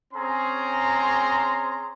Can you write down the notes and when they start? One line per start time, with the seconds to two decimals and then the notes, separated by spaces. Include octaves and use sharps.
0.14 C4 C#4 G#4 A#5 C6